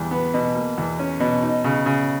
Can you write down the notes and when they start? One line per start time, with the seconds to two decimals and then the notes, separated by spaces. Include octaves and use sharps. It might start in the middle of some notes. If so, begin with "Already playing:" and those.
Already playing: E2 G3
0.11 B3
0.34 B2
0.55 A#3
0.78 E2
0.99 C#4
1.20 B2
1.43 D#4
1.64 C#3
1.86 C#3